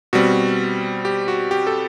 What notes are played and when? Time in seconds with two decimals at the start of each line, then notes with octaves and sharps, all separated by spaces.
0.13 B2 G3 C4 F#4
1.05 G4
1.28 F#4
1.51 G4
1.67 A4